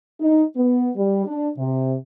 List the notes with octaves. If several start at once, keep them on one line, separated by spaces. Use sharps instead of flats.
D#4
B3
G3
D4
C3